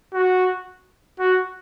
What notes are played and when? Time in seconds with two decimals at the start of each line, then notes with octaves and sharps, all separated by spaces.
0.14 F#4
1.20 F#4